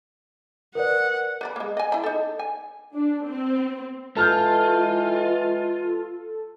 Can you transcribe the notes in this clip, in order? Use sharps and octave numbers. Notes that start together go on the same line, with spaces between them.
A#4 B4 D5 F#5
B4 D5 B5
G#3 A#3
D#5 G#5
E4 B5
D#4 A4
G#5
D4
C4
E3 G#3 F4 A4 A5 F6 G6